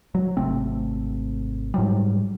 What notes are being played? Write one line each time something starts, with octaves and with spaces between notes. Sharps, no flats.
F#3
G#1 C3 A3 C4
G#2 F#3 G3